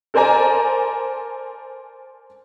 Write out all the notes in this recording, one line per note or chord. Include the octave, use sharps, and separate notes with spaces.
A4 A#4 C5 D5 G#5 A#5